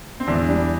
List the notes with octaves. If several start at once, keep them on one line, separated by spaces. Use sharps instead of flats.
C4
E2 D4
G3 D4